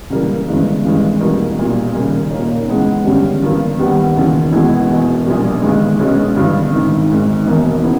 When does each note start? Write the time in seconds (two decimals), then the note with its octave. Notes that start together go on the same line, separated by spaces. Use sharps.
0.10 C#2 C#3 E3 G3 A#3
0.48 G1 G2 E3 G#3
0.83 G#1 G2 E3 G#3
1.20 E2 B2 G3 A#3 E4
1.57 B1 A#2 G3
1.94 D#2 C#3 G3 A#3
2.31 A#2 A#3 D#4 A#4 C#5
2.68 C#3 E3 G#3 B3
3.05 G1 G2 G3 C#4 G4
3.42 G1 G2 E3 A#3
3.79 D#2 D#3 G3 B3 G4
4.15 E1 D#2 C#3 E3
4.52 E2 B2 G#3 B3 E4
4.89 E1 E2 B2
5.26 A#1 A#2 G3
5.62 G1 G2 D#3 G#3
5.99 B1 B2 G#3 C#4 G#4
6.36 G1 G2 E3
6.73 G#1 G#2 D#3
7.10 G#1 G#2 D#3
7.46 E1 E2 D#3 A#3
7.83 C#3 B3 E4